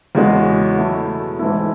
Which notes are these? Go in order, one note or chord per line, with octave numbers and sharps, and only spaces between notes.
E2 C#3 G#3 C#4 F#4
B2 F#3 A3 E4
G#2 E3 A3 E4